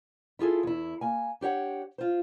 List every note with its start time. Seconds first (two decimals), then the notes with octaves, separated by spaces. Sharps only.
0.39 E4 F4 G#4 A4
0.63 E2 E4
1.01 A#3 G#5
1.41 D4 G4 C#5 F#5
1.98 F4 C5